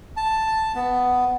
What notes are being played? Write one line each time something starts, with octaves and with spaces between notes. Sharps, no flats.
A5
B3